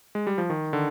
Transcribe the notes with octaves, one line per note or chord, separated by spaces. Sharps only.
G#3
G3
F3
D#3
D3